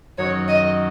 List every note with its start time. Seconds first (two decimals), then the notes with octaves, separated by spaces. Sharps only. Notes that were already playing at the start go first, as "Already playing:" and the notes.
0.18 F#2 D#3 F#3 C#5
0.48 D#5